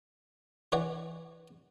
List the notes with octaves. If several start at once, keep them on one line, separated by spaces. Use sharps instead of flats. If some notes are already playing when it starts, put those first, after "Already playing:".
E3 C#5 D5 F#5